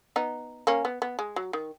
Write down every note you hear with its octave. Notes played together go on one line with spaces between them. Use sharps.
B3 D#4
A#3 C#4
B3
B3
G#3
F#3
D#3